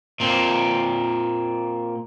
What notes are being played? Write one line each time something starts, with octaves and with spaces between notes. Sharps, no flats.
A#2 C4